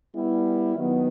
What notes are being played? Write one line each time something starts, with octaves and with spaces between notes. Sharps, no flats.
G3 B3 E4
D#3 F#3 B3